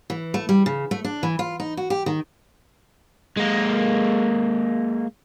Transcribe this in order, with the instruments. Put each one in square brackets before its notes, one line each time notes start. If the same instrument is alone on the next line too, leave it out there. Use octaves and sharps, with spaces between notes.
[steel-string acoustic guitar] E3
A3
G3
C#3
A3
D4
E3
F4
D#4
F#4
G4
D#3
[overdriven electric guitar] G#3 A#3